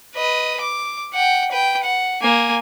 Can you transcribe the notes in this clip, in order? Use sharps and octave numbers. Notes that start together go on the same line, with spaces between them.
B4 D#5
D6
F#5 G5
B4 G5
F#5
A#3 G#5